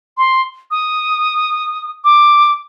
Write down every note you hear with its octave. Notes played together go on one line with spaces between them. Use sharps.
C6
D#6
D6